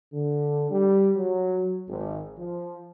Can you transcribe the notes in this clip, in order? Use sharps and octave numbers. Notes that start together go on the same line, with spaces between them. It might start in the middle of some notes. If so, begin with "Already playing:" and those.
D3
G3
F#3
G#1
F3